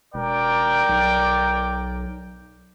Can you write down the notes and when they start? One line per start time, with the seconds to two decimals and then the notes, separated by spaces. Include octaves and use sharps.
0.14 E1 A#4 D5 G5
0.89 B1